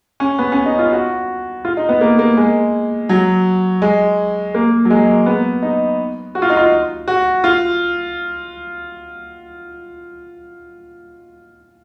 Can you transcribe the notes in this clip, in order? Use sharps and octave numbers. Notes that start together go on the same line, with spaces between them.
C#4
B3
C#4
D#4
F4
F#4
F4
D#4
B3
A#3
A#3
G#3
F#3
G#3
A#3
F#3
G#3
B3
D#4
F#4
F4
D#4
F4
F#4
F4